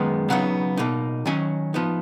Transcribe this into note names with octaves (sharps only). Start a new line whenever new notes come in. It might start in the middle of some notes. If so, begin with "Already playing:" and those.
Already playing: F#2 D#3 G#3 B3
C#3 F#3 B3 D#4 F#5
B2 A#3 D#4
D#3 F#3 C#4 G#5
F3 B3 D#4